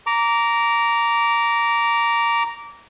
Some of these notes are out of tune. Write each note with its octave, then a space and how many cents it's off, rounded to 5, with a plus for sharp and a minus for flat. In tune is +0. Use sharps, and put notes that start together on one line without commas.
A#5 +0 D6 -20